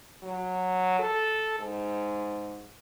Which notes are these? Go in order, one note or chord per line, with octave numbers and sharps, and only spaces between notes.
F#3
A4
G#2